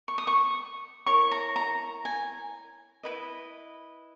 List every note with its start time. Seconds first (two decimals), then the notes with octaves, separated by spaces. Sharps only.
0.08 C#6
0.18 D#6
0.27 C#6
1.06 E4 A#4 C#5 C#6
1.31 A#5
1.56 A#5
2.05 G#5
3.03 E4 B4 D#5